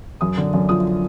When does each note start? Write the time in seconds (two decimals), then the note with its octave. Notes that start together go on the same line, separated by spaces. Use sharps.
0.21 F#2 D#6
0.38 D3
0.54 F#2
0.69 F3 D#6